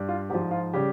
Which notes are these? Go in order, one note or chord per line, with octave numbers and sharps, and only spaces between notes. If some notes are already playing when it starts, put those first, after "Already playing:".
Already playing: G2 G3
F4
G#2 F3 G4
F4
C#3 G3 G4